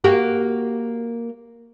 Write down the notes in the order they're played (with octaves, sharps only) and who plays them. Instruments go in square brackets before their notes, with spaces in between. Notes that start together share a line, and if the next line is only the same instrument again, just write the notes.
[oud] A#3 F#4 G4